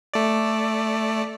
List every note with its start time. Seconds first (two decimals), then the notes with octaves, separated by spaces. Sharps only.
0.14 A3 D5